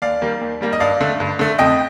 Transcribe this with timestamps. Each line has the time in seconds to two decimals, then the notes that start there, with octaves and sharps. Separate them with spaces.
0.02 D#2 D5 F5
0.21 D#3 G3 A#3
0.41 D#2
0.61 D#3 G3 A#3
0.73 D#5
0.80 G2 D5 F5
1.01 D3 A3
1.20 G2
1.39 D3 A3
1.59 F2 D#5 G5